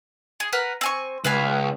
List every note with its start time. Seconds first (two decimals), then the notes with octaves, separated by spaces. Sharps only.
0.40 G#4
0.52 A#4 B4 F#5
0.81 C4 G#5 C#6
1.24 C#2 B4 F5 G#5